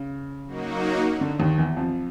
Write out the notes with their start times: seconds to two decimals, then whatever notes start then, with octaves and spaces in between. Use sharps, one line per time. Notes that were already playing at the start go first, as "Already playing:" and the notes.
Already playing: C#3
0.47 F#3 A#3 D#4 F#4
1.21 D3
1.39 D#2 D#3
1.58 E2 E3
1.77 F2 F3